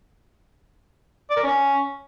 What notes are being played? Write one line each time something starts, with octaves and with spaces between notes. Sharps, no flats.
D5
A#4
C#4